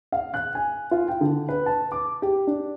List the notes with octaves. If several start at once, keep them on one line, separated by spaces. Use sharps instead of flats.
F5
F#6
G#5
F4
G5
D3
B4
A5
D6
G4
D4